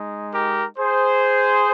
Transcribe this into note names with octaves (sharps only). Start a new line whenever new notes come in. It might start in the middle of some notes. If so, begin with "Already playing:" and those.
Already playing: G#3 D#4
G4 A#4
G#4 C5